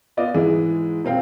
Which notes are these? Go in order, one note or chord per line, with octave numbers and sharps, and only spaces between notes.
B3 F4 D5 D#5
G#2 E3 G#3
D#1 C4 F5 G5